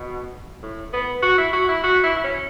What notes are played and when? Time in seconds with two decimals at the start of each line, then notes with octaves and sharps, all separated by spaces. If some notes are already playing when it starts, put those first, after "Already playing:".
Already playing: B2
0.62 A2
0.93 B3
1.23 F#4
1.38 E4
1.53 F#4
1.69 E4
1.83 F#4
2.03 E4
2.17 E4
2.24 C#4